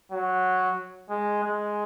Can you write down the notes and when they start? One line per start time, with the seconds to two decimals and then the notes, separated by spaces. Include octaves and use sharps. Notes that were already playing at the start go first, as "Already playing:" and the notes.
0.12 F#3
1.10 G#3
1.43 G#3